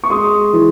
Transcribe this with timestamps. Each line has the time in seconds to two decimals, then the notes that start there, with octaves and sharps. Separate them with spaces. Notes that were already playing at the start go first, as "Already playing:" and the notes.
0.04 C#6
0.10 G#3 C6 D#6
0.53 E3